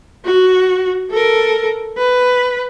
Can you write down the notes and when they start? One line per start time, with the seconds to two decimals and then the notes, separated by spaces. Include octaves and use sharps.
0.25 F#4
1.10 A4 A#4
1.98 B4